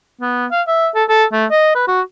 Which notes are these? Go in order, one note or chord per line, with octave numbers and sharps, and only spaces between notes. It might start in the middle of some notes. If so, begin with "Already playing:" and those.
B3
F5
E5
A4
A4
A3
D#5
B4
F#4